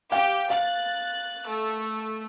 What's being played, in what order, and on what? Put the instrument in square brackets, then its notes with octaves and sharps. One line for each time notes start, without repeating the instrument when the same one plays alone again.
[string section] G4 [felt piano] F5 G5
[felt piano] F5 [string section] F#6 A6
[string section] A3